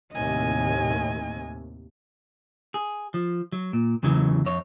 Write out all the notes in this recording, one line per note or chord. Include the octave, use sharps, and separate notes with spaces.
D#2 A2 C3 D#5 G#5
G#4
F3
F#3
A#2
E2 C#3 E3 F#3
F2 C#5